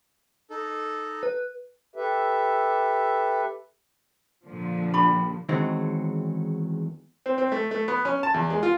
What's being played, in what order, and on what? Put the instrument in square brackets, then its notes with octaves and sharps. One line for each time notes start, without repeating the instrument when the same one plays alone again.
[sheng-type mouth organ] D#4 A4
[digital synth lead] B4
[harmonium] G4 A4 B4 E5
[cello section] A#2 D3 F3
[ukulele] D4 G4 B5
[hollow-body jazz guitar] E2 D#3 F#3 G#3 C4 D#4
[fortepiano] C4
C4
A3
A3
B3
C#4
A5
E2
G#3
F4